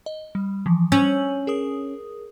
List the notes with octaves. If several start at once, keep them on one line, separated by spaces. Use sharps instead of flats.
D#5
G3
E3 F3
C#4 E6 G6 F#7
G#4 A#4 D#6